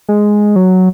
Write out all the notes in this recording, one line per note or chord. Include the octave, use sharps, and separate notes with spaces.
G#3
F#3